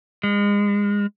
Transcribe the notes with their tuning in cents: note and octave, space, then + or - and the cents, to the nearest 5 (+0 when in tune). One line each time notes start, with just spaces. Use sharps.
G#3 -30